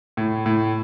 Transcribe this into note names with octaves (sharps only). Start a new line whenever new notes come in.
A2
A2